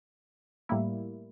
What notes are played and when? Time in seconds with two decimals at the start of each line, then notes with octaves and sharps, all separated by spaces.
0.69 A2 G3 A#3 E4